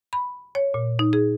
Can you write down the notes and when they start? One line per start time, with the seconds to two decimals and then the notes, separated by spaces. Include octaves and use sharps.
0.13 B5
0.55 C#5
0.74 A#2
0.99 D#4
1.13 G#4